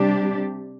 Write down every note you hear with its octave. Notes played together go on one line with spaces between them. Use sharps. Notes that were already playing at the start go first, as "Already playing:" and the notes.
Already playing: C3 G3 D4 G4